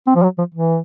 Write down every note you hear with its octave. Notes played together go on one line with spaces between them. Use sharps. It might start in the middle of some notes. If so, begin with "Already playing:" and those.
C4
F3
F#3
F3
E3